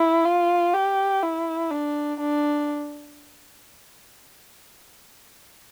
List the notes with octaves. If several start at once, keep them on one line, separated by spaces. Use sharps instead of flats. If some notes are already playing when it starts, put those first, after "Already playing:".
Already playing: E4
F4
G4
E4
D4
D4